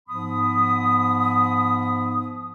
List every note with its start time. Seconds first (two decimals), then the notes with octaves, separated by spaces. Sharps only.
0.09 G#2 F3 B3 B5 D#6